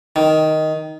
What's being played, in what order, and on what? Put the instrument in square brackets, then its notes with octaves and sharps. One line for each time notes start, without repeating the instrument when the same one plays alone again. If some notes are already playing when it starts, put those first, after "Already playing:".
[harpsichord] D#3